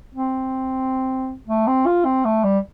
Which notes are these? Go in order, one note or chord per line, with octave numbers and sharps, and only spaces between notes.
C4
A3
C4
F4
C4
A3
G3